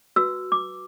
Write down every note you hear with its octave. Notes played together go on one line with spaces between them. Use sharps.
F#4 B4 E6
D6